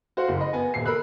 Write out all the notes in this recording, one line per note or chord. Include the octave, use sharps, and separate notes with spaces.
F#4 C5 F5 F#5
F#1
D#5 B5
B3 G#5
D#1 C7
A#4 B5 E6 F#6